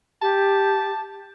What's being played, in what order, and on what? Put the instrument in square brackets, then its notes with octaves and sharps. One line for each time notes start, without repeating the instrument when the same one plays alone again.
[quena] G4 [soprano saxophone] A5